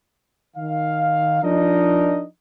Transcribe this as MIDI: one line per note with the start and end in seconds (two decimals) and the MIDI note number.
0.57 1.42 51
0.57 1.42 77
1.43 2.25 53
1.43 2.25 62
1.43 2.25 63
1.43 2.25 70
1.43 2.25 75